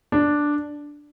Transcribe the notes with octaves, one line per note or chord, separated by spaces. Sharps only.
D4